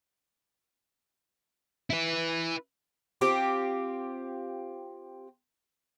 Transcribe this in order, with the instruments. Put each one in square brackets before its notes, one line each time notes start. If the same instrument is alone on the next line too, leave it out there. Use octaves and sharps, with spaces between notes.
[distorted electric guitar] E4 B4
[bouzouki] C4 F4 G4